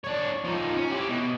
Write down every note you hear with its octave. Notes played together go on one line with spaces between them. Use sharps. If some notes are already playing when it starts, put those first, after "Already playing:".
D4 C#5
F3 D#4
C#4
E4 G4
B2